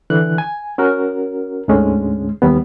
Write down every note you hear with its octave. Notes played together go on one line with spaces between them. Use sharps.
D3 E3 F#6
G#5
C#4 F#4 A#4
D2 G#2 D3 G#3 C#4
D#2 G3 B3